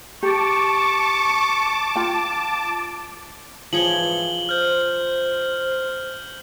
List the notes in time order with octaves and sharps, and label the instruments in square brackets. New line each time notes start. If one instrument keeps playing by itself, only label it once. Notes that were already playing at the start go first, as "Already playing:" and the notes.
[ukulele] G4 [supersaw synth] A5 D6 [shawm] C#6
[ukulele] F4 G5
[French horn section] G#2 E3 [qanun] F3 G#4 C#5 [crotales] F#7 G7
[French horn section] C5 [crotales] F6 G6